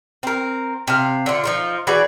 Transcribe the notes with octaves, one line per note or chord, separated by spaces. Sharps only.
C4 A#4
C3 F5
D3 F4
F3 D#4 F4
E3 F#4 G#4 D5